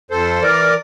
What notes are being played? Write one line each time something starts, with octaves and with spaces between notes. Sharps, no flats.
F2 A4 C5
E3 A#4 D5